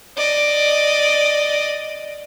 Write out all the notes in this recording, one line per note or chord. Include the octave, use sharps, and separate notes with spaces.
D5 D#5